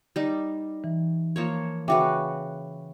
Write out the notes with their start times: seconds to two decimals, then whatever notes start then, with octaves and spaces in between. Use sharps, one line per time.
0.16 G3 D#4
0.84 E3
1.36 F3 A#3 C#5
1.88 C#3 F#4 B4 E5 G5 D6